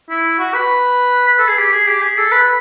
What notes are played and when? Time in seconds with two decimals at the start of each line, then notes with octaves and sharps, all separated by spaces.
0.10 E4
0.39 F#4
0.54 B4
1.28 B4
1.38 A4
1.47 G#4
1.58 G4
1.72 G#4
1.87 G4
2.02 G#4
2.18 A4
2.32 B4